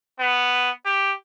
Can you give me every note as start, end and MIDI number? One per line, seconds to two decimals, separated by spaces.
0.20 0.71 59
0.86 1.14 67